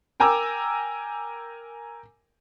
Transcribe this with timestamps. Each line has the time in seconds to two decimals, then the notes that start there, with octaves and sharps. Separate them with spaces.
0.20 A#4 G5 G#5 A#5 D6 E6